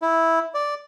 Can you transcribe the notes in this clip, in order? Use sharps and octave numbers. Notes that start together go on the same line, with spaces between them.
E4
D5